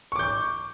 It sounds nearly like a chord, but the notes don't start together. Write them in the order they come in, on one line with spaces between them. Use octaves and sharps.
C#6 D6 G6